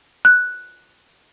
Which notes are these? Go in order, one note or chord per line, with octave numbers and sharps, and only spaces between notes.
F#6